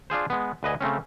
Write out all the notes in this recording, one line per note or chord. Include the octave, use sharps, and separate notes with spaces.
D4 F4 G#4 C5
G#3 B3
D2 B4 D#5 G#5
C#3 A3 C4 C#4